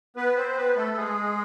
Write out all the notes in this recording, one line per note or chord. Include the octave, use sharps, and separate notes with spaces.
B3 B4
C4 C5
B3 B4
A3 A4
G#3 G#4